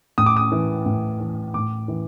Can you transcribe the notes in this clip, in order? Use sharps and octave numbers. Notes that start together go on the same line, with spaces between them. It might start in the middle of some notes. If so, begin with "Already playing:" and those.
A2 D#6
D6
D#6
E3
A2
E3
A2 D6
E3